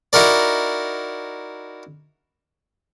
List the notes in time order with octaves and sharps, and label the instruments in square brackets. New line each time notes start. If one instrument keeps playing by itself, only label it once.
[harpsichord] D#4 E4 F#4 A#4 D5